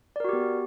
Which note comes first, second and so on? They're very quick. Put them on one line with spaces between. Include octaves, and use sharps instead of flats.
D5 A#4 F#4 G4 B3